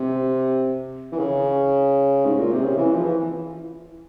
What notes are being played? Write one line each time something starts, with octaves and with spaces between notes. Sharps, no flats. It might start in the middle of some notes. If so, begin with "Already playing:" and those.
Already playing: C3
E3
C#3
G#2
A#2
C3
C#3
E3
F3
E3